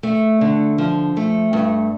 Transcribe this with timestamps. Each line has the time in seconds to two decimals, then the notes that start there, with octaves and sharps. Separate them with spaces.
0.03 A3
0.41 D3
0.78 F3
1.17 A3
1.53 G2